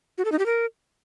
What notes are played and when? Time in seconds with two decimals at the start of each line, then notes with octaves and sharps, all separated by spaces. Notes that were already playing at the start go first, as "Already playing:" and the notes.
0.18 F#4
0.25 A4
0.32 D#4
0.39 G4
0.46 A#4